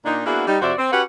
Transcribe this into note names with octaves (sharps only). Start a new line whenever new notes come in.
A#2 A#3 D4 D#4
A#3 B3 D4 E4 F#4 G#4
G3 D#4
F2 C3 F#4 C5 D5 E5
C4
C#4 F#4 G4 B4 F#5